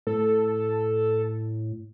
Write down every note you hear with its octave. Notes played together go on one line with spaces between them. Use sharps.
A2 A4